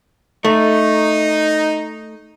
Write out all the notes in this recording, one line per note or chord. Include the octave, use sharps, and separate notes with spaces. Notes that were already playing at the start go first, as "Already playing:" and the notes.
A3 D#4